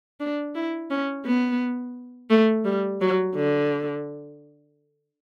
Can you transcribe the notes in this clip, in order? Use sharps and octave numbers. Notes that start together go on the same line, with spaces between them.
D4
E4
C#4
B3
A3
G3
F#3
D3